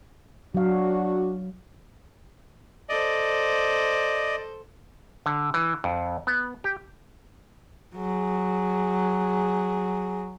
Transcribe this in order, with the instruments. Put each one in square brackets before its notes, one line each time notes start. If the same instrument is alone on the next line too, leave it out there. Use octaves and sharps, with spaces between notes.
[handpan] F#3 F5 [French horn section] D4 F#4
[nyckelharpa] A4 C5 [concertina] D5 D#5
[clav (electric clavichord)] D3
E3
F2
B3
G4
[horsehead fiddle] F#3 G#4